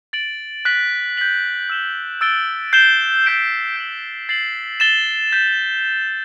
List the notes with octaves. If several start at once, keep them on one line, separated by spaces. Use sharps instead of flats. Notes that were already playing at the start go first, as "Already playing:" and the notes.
A6 D7 F#7
F#6 B6 F#7
G6 B6 F#7
E6 B6 E7 G7
E6 A6 D7 G7
G6 C7 E7 G7
G6 B6 D7 G7
G6 D7 F#7
A6 C7 F#7
A6 E7 G7
G6 B6 E7